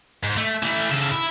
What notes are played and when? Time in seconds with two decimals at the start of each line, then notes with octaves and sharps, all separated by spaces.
0.23 G#2
0.37 A3
0.63 E3 A3
0.90 C#3 A4
1.11 E4